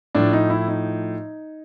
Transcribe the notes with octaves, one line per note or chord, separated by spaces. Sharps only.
A2 F3 D4
D#4
E4
D#4